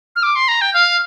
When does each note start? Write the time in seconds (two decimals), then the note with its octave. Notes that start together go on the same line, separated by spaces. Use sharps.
0.16 F6
0.23 D6
0.36 C6
0.48 A#5
0.61 G5
0.74 F5